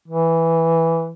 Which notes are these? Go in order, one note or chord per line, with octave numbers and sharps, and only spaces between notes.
E3